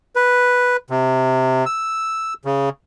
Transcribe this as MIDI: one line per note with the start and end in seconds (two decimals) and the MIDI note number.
0.16 0.77 71
0.90 1.65 48
1.66 2.34 88
2.45 2.69 49